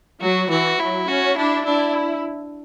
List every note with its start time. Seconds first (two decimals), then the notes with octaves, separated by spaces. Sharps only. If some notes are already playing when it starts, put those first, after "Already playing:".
0.21 F#3 F#4
0.50 E3 F#4
0.80 F#3 E4
1.07 C#4 F#4
1.37 D4 E4
1.65 D4 E4